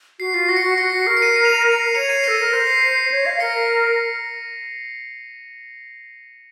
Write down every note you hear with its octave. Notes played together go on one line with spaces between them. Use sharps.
F#4 C7
F4 C7
F#4 A#6
C#7
F#4 C7
F#4 A#6 C#7
F#4 C7
A#4 C7
C#7
C7 D#7
D#7
F7
D#7
F7
C7 D#7
C#5 C#7 F7
C7 D#7
A4 A#6 C#7
A#4 A#6
C5 A#6
C7
C7
C#5
F5
A#4 A#6 C#7